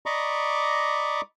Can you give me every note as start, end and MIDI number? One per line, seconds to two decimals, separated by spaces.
0.06 1.21 74
0.06 1.21 75
0.06 1.21 82
0.06 1.21 83
0.06 1.21 85
0.06 1.21 86